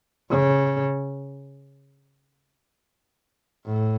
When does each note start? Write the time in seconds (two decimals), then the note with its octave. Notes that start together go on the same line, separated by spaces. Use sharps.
0.30 C#3
3.66 A2